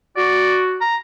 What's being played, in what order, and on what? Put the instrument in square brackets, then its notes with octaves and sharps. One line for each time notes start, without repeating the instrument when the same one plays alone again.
[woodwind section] F#4 [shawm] D5
[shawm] A#5